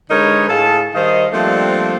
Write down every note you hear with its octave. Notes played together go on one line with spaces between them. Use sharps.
D3 G#3 D#4 A#4 B4 C#5
A2 G#4 A4 F5 A5
D#3 G3 D#4 C5 D#5 F5
F3 G3 A3 A#3 C4 D4